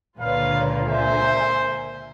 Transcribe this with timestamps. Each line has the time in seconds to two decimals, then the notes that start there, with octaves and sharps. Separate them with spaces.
0.20 C#2 A#2 D3 F4 B4 C#5 F5
0.87 A#4 C5 E5 G#5